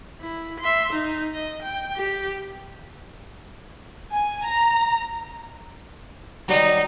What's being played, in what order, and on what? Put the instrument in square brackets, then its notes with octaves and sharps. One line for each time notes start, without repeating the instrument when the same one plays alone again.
[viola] E4
E5 C6
D#4
D#5
G5
G4
[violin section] G#5
A#5
[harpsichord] D#3 F#3 G3 [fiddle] D#4